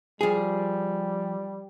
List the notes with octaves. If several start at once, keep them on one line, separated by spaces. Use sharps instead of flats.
F3 G3 G#4